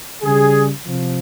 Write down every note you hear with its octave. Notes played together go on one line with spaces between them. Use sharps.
C#3 G3 G#4
C3 F3